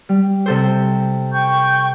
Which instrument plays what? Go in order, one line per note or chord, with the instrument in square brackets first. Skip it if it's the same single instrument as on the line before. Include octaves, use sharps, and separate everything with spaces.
[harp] G3
C3 A4 C5
[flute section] G5 C#6 G6